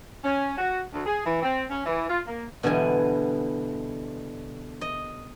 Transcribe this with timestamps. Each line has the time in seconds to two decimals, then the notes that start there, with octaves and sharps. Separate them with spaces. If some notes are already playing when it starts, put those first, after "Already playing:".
0.24 C#4
0.58 F#4
0.93 D2
1.06 G#4
1.25 E3
1.42 C4
1.70 C#4
1.85 E3
2.10 F4
2.27 A#3
2.63 B2 D3 E3 G3 G#5
4.81 D#5